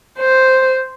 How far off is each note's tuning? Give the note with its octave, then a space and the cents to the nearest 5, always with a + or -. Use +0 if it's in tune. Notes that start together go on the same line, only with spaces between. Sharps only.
C5 +0